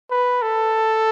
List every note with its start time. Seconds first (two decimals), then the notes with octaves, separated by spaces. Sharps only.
0.11 B4
0.42 A4